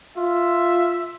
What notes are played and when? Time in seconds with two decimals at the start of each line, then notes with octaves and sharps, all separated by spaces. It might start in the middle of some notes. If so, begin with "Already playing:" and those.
0.17 F4 E5